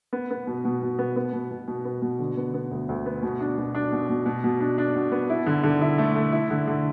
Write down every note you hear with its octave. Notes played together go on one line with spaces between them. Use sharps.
B3
B3
B2
B2
B2
B3
B3
B2
B2
B2
B3
B2
D3
B3
B3
D2
D2
B3
B2
D4
B2
D4
B2
B2
B2
B2
D4
D4
B2
B3
E4
D3
D3
E4
A3
A3
E4
D3
D3